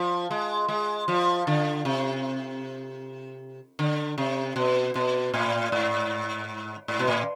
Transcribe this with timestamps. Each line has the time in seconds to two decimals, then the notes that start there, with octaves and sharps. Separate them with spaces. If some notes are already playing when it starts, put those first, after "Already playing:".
Already playing: F3
0.31 G#3
0.68 G#3
1.08 F3
1.47 D3
1.85 C3
3.79 D3
4.18 C3
4.56 B2
4.95 B2
5.34 A2
5.72 G#2
6.88 G#2
6.99 B2
7.08 A2